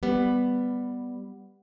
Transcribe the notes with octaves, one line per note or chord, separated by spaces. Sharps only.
G3 B3